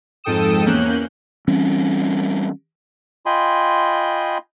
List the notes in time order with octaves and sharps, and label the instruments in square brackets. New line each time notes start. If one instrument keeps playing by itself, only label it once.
[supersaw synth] F2 G#2 A4 G5 D#6 E7
E2 A#3 C#4 F#6 G6
[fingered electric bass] E3 G3 C4 C#4
[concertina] F4 D#5 G5 G#5 B5 C6